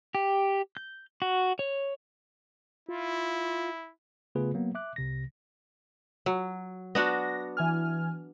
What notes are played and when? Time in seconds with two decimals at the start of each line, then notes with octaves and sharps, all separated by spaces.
0.15 G4
0.77 G6
1.22 F#4
1.59 C#5
2.89 E4 F4
4.35 C#3 A3 B3 F4 G#4 B4
4.54 F#3 A#3 B3
4.75 E5 D6 F#6
4.96 C2 C3 A#6
6.26 F#3
6.95 B3 D4 F#4 A#6
7.57 E3 G#5 F6